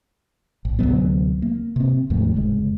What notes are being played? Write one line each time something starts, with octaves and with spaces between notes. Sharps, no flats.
A1
D2 C3 F#3 B3
A#3
C3 C4
D#2 G#2 F3 A3
F1 C#3 G#3